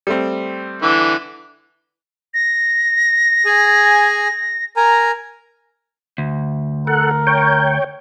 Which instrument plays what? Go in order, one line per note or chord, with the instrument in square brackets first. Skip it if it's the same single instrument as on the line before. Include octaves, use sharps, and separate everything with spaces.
[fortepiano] G3 A3 C4
[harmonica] D3 E3
[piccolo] A#6
[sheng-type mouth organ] G#4 G#5
A#4 G#5 A#5
[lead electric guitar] D2
[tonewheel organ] A4 F#5 [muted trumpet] A#4
[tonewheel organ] C#5 G5